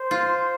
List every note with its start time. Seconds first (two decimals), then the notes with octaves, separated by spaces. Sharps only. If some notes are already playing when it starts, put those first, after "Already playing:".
Already playing: C5
0.11 F4